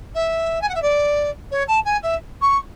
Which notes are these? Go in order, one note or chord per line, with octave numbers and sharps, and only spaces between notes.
E5
G#5
F#5
E5
D5
C#5
A5
G#5
E5
C#6